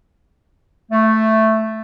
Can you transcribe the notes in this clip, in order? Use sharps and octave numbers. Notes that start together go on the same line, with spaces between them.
A3